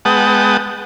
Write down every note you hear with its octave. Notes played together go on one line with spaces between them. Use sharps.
G#3 B3 F#5 G5 A5 D#6